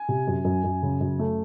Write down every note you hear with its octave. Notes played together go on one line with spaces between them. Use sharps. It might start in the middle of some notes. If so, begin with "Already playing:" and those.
Already playing: G#5
C3
F#2
F#2
F#2
C#3
F#2
A3